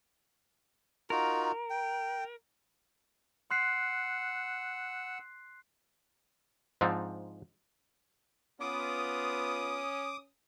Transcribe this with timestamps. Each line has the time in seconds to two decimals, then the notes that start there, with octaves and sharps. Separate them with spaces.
1.10 D#4 F4 F#4 A#4
1.70 G5
3.51 F#5 C6 E6 F#6 C7
6.81 G#2 F3 C4 D4 D#4
8.61 B3 C#4 F4 D6 D#6